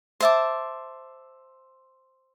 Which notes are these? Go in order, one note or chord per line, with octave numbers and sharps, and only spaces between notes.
C5 E5 A5 D6